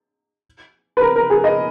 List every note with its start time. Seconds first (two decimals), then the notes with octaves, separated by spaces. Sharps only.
0.97 B4
1.02 A#4
1.16 A#4
1.30 G#4
1.44 D#5